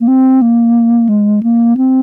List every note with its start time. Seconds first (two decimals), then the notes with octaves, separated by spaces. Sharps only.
0.01 A#3
0.08 C4
0.42 A#3
1.09 G#3
1.43 A#3
1.77 C4